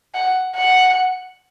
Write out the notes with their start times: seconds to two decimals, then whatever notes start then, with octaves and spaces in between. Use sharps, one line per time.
0.14 F#5
0.56 F#5